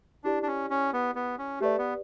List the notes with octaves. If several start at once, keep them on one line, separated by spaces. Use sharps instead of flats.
D4 E4 G4 D5
D4
C#4
C#4
B3
B3
C#4
A3 G4 B4 D5
B3